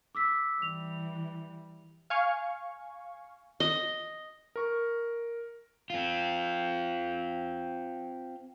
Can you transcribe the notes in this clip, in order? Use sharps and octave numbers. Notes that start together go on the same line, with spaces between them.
D6 E6 B6
E3 G3 F7
F5 G#5 C#6
D#5
A#4 C#6
C4 F4